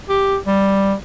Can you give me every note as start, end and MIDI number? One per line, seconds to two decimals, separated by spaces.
0.09 0.37 67
0.47 0.94 55